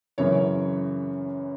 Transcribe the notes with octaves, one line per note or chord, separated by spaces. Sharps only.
F#2 C#3 E3 C#5